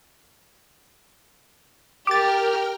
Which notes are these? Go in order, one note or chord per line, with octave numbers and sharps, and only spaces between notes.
G4 A#4 G5 D6 F6 A6